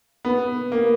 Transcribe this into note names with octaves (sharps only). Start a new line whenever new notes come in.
B3
A#3